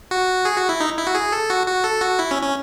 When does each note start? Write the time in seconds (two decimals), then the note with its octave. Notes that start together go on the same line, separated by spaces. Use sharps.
0.11 F#4
0.45 G#4
0.56 F#4
0.69 E4
0.80 D#4
0.98 E4
1.07 F#4
1.15 G#4
1.32 A4
1.50 F#4
1.66 F#4
1.84 A4
2.01 F#4
2.19 E4
2.31 C#4
2.42 C#4